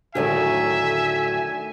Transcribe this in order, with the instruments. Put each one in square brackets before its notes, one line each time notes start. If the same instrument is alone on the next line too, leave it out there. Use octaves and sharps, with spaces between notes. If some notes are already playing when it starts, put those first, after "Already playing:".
[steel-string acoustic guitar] D#2 A2 F#3 [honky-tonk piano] D3 D#3 A3 [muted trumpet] E5 [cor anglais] G#5